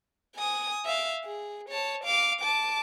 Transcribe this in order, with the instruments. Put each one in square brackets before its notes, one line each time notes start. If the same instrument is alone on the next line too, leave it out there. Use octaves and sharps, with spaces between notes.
[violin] G#5 D#6
E5 F5
G#4
C#5 A5
F5 D6
A5 D6